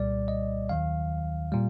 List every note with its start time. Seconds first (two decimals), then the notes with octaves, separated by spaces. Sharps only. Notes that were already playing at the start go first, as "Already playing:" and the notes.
Already playing: C2 A#2 G3 D5
0.28 D#5
0.69 D#2 D#3 F#3 F5
1.52 A#2 G3